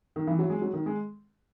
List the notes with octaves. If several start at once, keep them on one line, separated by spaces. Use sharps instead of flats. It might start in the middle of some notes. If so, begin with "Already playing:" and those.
D#3
E3
F#3
G#3
F#3
D#3
G#3